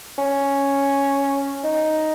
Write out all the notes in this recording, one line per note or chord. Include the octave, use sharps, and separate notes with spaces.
C#4
D#4